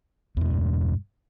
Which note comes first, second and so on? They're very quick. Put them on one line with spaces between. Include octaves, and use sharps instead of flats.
E2 B2 G#3 G2